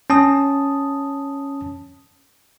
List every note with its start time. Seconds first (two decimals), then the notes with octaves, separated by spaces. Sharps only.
0.10 C#4 A5 D#6